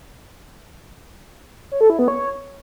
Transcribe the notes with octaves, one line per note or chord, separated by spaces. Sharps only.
C#5
A4
E4
B3
C#5